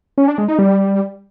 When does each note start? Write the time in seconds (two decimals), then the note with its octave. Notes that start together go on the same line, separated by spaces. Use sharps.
0.18 C#4
0.28 D4
0.38 G#3
0.48 D#4
0.59 G3